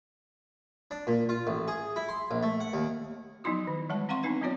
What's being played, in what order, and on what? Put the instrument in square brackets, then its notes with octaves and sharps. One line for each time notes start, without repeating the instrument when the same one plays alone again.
[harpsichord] D4
A#2
F4
A1
G#4
E4
C6
A#1
A3
F#5
D#2
[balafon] F3 F#3 B3 D#4 E4 F#4
D#3
E3 G3 G#3 A5
C4 F5 F#5 C6 C#6
B3 C4 D4 D#4 B4 F#5
F#3 B3 C4 F4 C#5 D5